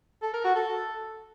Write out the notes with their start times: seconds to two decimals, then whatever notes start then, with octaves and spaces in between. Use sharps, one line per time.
0.22 A4
0.33 A#4
0.44 F#4
0.55 A4